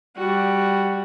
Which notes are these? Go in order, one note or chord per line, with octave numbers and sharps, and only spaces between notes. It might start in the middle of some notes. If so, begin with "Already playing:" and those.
G3 F#4